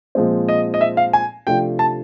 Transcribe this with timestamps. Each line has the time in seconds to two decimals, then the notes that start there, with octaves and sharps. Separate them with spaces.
0.15 A#2 F3 G#3 C4
0.49 D#5
0.74 D#5
0.81 E5
0.97 F5
1.13 G#5
1.47 C3 F3 A3 D4 F4 G5
1.79 A5